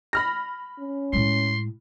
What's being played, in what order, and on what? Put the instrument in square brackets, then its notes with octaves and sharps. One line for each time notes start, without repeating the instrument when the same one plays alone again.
[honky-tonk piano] B5 F6 A#6
[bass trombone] C#4
[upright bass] A2 G#3 [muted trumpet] C6